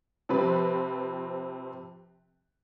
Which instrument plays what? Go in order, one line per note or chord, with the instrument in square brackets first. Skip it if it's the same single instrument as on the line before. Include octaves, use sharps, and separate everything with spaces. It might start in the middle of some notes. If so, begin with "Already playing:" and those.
[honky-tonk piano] C3 F3 C4 B4